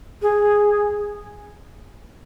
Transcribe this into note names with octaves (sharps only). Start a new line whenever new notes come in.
G#4